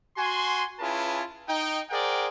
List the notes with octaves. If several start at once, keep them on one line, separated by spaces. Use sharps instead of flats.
F#4 G#5 C6
C#4 E4 F4 G#4 B4 A5
D#4 G5
G#4 A#4 C5 D5 F#5 G5